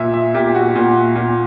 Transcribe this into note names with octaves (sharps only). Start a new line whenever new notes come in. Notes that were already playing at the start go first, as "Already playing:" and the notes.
Already playing: A#2 E5
E5
A#2 G4
F#4
A#2
A#2